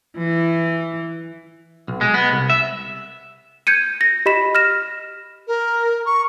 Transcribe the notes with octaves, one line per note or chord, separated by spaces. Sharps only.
E3
B1
G#3
B3
C2
E5
G6 G#6 C#7 D#7
A#6
G4 D#5 B5 B6 E7
F6 A#6 E7
A#4
C#6